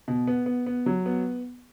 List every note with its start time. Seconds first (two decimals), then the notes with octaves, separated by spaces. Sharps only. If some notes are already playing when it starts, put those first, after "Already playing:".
0.08 B2
0.27 B3
0.46 B3
0.66 B3
0.86 F#3
1.06 B3